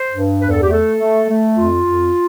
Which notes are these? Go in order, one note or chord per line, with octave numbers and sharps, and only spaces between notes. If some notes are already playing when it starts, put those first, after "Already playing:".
Already playing: C5
G2
E2 B4
A4
G4
A3 A4
A3
A3
F2 F4
F2